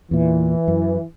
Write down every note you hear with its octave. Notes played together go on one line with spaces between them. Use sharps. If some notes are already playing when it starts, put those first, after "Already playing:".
E2 A#2 E3
F#2